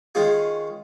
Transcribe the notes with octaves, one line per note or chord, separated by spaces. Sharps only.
D#3 G#3 C#4 F4 G#4